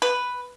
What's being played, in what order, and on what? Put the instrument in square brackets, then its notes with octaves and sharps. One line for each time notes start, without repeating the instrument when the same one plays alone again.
[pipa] B4